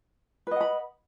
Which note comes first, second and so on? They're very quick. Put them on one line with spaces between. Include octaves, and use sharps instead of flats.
B4 D#5 F#5 B5